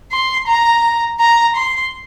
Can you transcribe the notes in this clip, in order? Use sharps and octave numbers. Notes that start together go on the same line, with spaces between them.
C6
A#5
A#5
C6